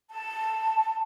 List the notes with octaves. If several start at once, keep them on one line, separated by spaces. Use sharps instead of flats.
A5